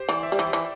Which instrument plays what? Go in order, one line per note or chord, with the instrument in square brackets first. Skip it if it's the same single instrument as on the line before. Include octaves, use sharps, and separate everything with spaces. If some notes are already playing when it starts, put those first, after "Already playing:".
Already playing: [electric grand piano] G4 C5
[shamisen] E3 [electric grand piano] D5
[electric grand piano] E5
[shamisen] G3
[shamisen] E3 [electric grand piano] G5
[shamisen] E3